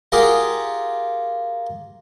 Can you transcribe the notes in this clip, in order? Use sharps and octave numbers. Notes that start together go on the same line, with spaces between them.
F4 G4 G#4 A#4 F#5